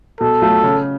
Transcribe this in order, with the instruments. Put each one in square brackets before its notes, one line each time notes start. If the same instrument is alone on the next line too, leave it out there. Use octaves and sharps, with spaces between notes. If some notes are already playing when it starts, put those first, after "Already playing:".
[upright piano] B2 [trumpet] A4
[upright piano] F#3 A3 F4
C#3